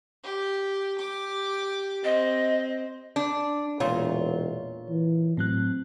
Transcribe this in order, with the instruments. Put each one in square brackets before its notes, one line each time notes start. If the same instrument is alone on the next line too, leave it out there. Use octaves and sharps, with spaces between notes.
[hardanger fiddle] G4
G4 D6
[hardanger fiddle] C4 [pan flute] D#5
[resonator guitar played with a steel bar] D4
[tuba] E1 [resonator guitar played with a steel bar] A#2 F4 [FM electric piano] C#5
[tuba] E3
[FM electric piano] A2 F#3 F#6 [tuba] C4